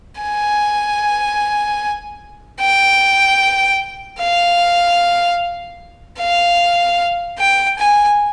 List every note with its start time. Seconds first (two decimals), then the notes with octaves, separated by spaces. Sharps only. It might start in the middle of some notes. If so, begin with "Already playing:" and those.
0.22 G#5
2.60 G5
4.20 F5
6.19 F5
7.39 G5
7.79 G#5